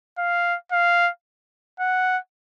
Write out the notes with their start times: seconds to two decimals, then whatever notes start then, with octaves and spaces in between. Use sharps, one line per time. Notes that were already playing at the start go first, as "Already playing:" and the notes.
0.18 F5
0.72 F5
1.80 F#5